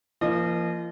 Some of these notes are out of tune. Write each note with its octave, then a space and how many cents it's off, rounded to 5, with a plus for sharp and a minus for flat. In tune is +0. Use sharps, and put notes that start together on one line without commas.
F3 -35 A#3 -5 D#5 -30